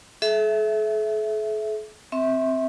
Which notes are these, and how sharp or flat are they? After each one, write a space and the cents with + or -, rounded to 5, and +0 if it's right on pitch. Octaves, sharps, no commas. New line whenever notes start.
A4 -45 E5 +0
C4 +0 E5 -20 C#6 -35